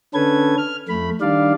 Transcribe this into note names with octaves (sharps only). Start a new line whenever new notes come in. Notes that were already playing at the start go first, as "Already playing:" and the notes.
D3 C#4 A4 B4 G#6
F6
F2 A3 B5
D#3 G3 D4 D5 F5